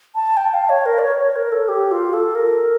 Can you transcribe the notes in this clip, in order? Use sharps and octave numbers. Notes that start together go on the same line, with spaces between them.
A5
G5
F5
C#5
A#4
D5
C#5
C#5
A#4
A4
G4
F4
A4
A#4